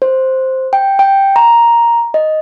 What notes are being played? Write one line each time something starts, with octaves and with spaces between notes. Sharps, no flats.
C5
G5
G5
A#5
D#5